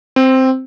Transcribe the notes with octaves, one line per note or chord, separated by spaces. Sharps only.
C4